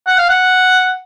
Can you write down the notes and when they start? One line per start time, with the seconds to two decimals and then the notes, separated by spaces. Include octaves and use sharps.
0.07 F#5
0.18 F5
0.29 F#5